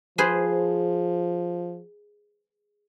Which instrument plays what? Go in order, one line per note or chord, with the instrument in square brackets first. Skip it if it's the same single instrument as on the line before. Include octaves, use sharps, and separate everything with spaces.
[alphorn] F3 [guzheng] G#4 B4 C5